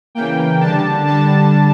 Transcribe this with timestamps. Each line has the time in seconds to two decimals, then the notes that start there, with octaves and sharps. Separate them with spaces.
0.15 C#3 E3 A#3 G5
0.60 D3 G3 D4 A5
1.07 D3 G3 D4 A5